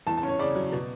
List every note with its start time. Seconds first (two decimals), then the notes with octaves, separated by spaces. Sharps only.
0.07 E2 A5
0.17 A5
0.23 C#4
0.28 C#5
0.39 C#3 D5
0.56 F#3
0.72 B2